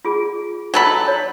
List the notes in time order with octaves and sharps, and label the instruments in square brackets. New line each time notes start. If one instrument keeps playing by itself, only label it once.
[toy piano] F4 G#4
[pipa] F#3 A4 B5
[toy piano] C#5